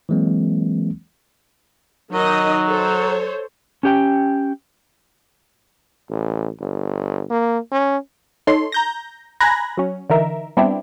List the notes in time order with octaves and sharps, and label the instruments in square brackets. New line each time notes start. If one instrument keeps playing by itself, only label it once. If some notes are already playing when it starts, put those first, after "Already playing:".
[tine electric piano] E3 F#3 G#3 A#3 C4
[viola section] D#3 D#4 D#5 [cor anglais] F#3
[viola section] A4 C5 C#5
[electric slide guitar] C#4 G4 G5
[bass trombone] A1
G1
A#3
C#4
[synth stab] D#4 A4 C#5 C6
A#5 G6 A#6
G#5 A#5 B5 F#6 G#6 A#6
F#3 C#4
D3 E3 D#4 A#4 E5
G3 B3 C4 D4 E4 G4